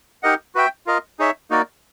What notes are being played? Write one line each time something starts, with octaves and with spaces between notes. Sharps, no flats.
D#4 G4 A#4 D#5 F#5
F#4 B4 E5 G5
F4 A#4 D#5
D#4 G#4 C#5 E5
A#3 D#4 F#4 A#4 D5